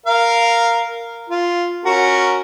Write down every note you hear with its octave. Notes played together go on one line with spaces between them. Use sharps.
A#4 F5
F4
C#4 F#4 A#4